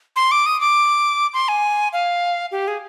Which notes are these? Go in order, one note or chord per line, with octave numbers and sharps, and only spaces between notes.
C6
D6
D#6
D6
C6
G#5
F5
G4
G#4